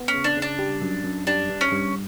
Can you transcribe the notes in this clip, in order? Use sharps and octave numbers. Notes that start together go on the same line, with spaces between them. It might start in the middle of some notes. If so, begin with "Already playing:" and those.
Already playing: B3
C#4
C#3
D4
C#3
D4
G3
F#2
F#2
G3 D4
G2
C#4
G2